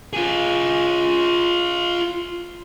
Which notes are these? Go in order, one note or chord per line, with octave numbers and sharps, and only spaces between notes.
F4 G#4